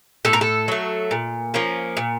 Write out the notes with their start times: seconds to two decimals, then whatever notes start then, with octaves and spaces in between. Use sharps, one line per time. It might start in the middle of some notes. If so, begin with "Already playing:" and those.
0.25 A2 A4
0.33 A#4
0.41 A4
0.68 F#3 A3
1.11 A#2
1.54 F3 A#3 C#4
1.97 A#2